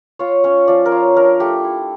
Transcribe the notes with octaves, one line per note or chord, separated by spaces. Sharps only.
F4 C#5
C#4 C#5
F3 D5
A#4
F4 C#5
D4 A#4
A3 G4
E4